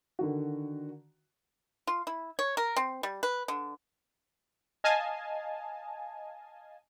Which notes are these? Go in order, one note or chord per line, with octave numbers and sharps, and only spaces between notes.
D3 D#3 F#4
F4
E4
C#5
A#4
C4
G3
B4
D3
D#5 F5 G#5 A5